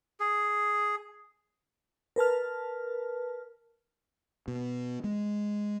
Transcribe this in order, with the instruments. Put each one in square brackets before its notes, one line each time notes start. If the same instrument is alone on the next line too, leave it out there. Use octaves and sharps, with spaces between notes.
[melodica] G#4
[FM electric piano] A#4 B4 A5 F6
[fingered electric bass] B2
G#3